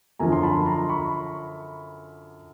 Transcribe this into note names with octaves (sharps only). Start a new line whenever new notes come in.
F#2 D3 F3 G#5 A#5
C6
A5 B5
A#5 C6
B5 C#6